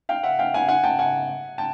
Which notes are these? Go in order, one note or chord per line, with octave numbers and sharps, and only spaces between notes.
F5 G5
E5 F#5
F5 G5
F#5 G#5
F#5 G#5
G5 A5
F#5 G#5
G5 A5